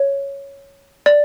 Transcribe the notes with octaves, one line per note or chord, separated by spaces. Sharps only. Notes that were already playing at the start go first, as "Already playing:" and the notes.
Already playing: C#5
D5